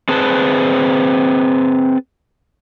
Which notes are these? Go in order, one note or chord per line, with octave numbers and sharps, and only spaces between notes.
C4 G#4 B4 A5